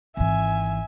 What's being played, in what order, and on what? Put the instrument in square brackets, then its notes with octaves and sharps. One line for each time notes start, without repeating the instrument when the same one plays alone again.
[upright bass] G#1 E3 [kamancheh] E5 G#5